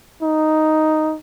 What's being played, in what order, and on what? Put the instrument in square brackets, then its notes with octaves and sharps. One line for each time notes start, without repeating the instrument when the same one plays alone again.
[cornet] D#4